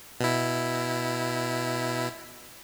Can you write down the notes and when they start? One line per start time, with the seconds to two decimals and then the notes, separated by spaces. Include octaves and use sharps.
0.20 B2 E4